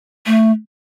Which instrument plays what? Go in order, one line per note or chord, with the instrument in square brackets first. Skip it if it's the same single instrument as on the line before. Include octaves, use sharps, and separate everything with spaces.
[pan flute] A3